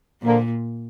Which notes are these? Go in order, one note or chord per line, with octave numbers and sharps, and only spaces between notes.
A#2 D3 F3 A#3